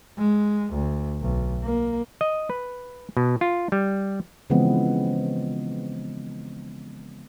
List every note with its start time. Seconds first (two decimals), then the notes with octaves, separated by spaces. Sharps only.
0.18 G#3
0.73 D2
1.22 B1
1.64 A#3
2.21 D#5
2.50 B4
3.17 B2
3.41 F4
3.72 G3
4.50 C#3 E3 F3 G#3 B3 C4